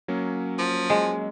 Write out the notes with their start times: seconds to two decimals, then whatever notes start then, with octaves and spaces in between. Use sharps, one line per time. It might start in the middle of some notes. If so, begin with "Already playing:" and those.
0.08 F#3 A#3 C#4
0.58 F3
0.90 G#3